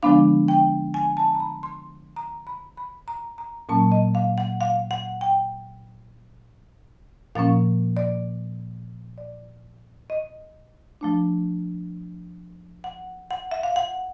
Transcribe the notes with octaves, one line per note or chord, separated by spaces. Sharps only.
D3 F3 G#3 B3 D4 F5
G5
G#5
A5
A#5
B5
C6
A#5
B5
B5
A#5
A#5
A#2 F#3 A#3 C#4 A5
D#5
F5
F#5
F5
F#5
G5
A#2 F3 A#3 C#4 F5
D5
D5
D#5
F3 A3 D4
F#5
F#5
E5
F5
F#5